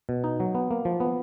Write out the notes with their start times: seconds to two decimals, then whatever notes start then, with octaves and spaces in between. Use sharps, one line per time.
0.09 B2
0.24 D#4
0.40 F#3
0.55 B3
0.71 A#3
0.85 F3
1.00 B3